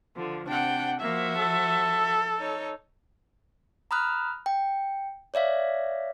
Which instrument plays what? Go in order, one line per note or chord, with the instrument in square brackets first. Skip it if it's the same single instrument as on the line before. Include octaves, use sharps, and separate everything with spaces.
[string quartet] D3 F3
[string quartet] C3 G5 [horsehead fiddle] D4 F#5
[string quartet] F3 F#4 E5 [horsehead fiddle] A#3
[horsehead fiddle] A4
[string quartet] D#4 C#5
[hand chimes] A#5 B5 D#6 F6 F#6
G5
C#5 D5 E5 F5